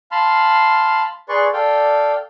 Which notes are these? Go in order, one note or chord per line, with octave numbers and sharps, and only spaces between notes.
F5 A5 B5 C6 F6
G#4 B4 D5 C6 C#6
A4 D5 F5 G5